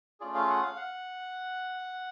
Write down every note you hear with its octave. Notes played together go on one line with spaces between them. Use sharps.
A3 C#4 F4 G#4 D5
F5
F#5
F5
F#5